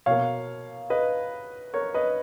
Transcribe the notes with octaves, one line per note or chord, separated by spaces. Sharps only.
B2 A#3 C#5 F5
B4 D#5
A#4 C#5
B4 D#5